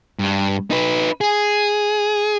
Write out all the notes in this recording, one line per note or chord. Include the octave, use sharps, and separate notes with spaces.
G2
D#4 B4
G#4